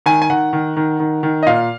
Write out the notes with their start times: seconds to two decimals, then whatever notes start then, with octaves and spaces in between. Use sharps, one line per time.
0.06 D#3 G#5
0.22 G#5
0.30 D#3 F#5
0.53 D#3
0.77 D#3
1.00 D#3
1.23 D#3
1.43 D#5
1.46 A#2 F5